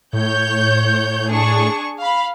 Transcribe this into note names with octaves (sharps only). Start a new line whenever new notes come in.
A2 C#5 G6
D4 G#4 C#6
F5 B5